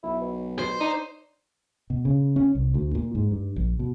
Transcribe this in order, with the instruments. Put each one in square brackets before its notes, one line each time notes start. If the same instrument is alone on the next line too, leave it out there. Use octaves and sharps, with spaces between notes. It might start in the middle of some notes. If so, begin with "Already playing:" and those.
[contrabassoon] B1 [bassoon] E4
[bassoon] B2
[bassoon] B2 [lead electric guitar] C5
[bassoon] D4 [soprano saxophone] D#4
[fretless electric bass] B2
C#3
C#4
C2
D2
A#2
G#2
G2
A#1
B2